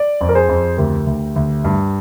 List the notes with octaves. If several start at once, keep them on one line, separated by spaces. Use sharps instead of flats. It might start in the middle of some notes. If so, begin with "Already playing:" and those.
Already playing: D5
F2
A#4
G#4 C5
F2
D2 G4 A#4
D2
D2
G2